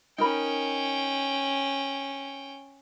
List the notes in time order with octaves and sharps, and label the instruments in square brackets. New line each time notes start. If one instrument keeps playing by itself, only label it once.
[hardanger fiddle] C#4 G5 [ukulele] D#4 A#4 B5